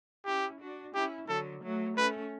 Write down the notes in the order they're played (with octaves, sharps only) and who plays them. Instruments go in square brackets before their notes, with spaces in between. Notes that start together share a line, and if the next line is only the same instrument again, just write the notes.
[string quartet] C#4 E4 [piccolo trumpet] G4
[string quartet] D4 F#4
[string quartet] C#4 E4 [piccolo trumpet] G4
[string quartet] D3 F#3 [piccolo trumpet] A4
[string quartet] F#3 A3
[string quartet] A3 C#4 [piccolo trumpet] B4